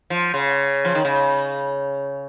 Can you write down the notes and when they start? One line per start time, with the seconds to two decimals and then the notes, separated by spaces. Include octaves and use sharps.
0.10 F3
0.34 C#3
0.85 F3
0.95 D#3
1.05 C#3